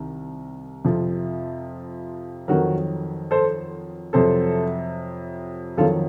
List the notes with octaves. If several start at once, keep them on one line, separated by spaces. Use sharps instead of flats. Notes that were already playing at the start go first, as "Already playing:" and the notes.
Already playing: C2 D#3
F2 C3 F3
F2 D#3 F#3 F#4 A#4
A4 C5
F2 C3 F#3 A4 C5
F2 D#3 F#3 F4 A4